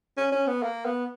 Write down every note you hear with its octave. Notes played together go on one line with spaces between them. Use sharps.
C#4
C#4
B3
A#3
B3